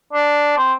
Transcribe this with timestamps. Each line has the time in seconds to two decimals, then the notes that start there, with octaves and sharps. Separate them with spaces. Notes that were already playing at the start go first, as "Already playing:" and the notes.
0.13 D4
0.58 C4